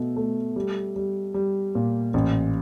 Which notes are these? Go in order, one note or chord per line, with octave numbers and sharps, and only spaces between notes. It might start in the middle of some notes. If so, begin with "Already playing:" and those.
Already playing: B2 A3
A3
G3
G3
G3
A#2
A1